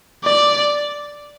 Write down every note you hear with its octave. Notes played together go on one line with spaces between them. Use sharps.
D5